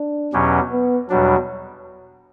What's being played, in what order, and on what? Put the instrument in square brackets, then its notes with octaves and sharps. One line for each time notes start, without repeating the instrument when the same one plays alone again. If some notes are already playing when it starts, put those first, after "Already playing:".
Already playing: [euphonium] D4
[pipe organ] E2 B2 F#3 C#4 G4
[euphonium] B3
[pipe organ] E2 B2 G3 D4 [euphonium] F#3